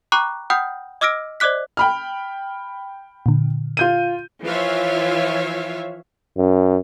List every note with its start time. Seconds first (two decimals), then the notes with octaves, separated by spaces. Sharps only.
0.12 G5 A#5 B5 C#6 D6 F#6
0.50 F#5 G5 B5 D#6 F6 G6
1.01 D#5 D6 E6 F6 A#6 D7
1.40 C5 D5 D#5 D6 F#6 B6
1.77 G5 B5 F6
3.26 A#2 D3
3.77 F4 G6 D#7
4.44 E3 F3 F4 C#5 E5 F5
6.37 F#2